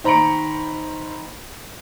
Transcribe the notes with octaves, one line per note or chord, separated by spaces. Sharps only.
D#3 C5 A#5 B5 C#7 D7